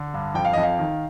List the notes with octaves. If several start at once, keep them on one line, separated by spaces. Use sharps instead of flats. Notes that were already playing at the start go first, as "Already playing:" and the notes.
Already playing: D3
G2
F2 G5
F5
F2 D#5
F5
D#3